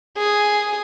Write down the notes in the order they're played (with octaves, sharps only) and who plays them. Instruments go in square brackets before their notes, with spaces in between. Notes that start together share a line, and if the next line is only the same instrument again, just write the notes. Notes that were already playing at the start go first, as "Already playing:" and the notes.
[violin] G#4